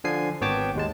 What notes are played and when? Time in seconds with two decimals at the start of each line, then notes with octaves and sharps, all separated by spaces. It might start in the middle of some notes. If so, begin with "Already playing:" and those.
0.04 D3 F3 G#5 C7
0.41 G#1 B3 C#5 G5 A5 D6
0.75 D#2 G#3 A5